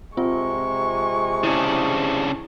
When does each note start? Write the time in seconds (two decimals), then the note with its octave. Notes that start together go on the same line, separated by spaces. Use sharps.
0.17 C3 G#3 C4 F4 C#6
1.44 C#3 D4 E4